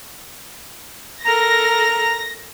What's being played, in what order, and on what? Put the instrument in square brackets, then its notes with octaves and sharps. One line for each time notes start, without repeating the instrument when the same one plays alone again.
[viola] A4 A#4 [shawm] A#5 [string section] A#6